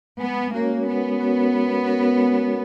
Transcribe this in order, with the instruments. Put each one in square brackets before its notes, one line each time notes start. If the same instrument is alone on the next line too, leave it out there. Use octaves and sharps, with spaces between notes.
[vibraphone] G#3 [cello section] B3
[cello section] A#3 [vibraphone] C#4 F#4 A#4 C#5
[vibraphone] G#3 [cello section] B3
[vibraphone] C#4 F#4 A#4 C#5
G#3
C#4 F#4 A#4 C#5
G#3